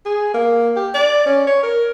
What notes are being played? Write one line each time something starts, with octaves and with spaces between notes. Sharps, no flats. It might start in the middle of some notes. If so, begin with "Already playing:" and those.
G#4
A#3
G4
D5
C#4
C#5
A#4